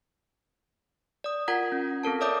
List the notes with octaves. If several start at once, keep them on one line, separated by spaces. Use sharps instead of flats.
D5 D#6
F4 A#4 F#5 A#5 G#6 B6
C#4
C4 A4 A#4 A5
C#5 D5 E5 D6 D#6 G6